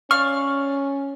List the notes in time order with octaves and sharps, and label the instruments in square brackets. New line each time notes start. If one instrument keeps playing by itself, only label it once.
[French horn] C#4 [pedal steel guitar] D5 F5 C#6 [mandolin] F6